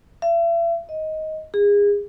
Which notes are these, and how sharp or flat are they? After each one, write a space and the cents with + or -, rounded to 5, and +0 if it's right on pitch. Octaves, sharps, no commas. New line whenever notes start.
E5 +40
D#5 +10
G#4 -30